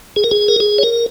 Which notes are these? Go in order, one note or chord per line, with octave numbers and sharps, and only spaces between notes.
G#4
A#4
G#4
A#4
G#4
C#5
A#4